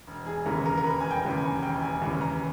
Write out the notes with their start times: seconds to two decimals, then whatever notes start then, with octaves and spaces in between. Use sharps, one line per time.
0.07 E1
0.27 G#4
0.46 D#2 C#3 E3 G3 A#4
0.66 A#4
0.77 A#4
0.84 E1 B4
1.00 G#5
1.11 G5
1.23 D#2 C#3 E3 G3
1.37 G#5
1.62 E1 G5
1.82 G#5
2.02 D#2 C#3 E3 G3
2.21 A#5